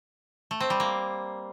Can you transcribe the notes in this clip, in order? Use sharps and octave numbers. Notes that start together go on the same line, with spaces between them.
A3
C4
G3
A#3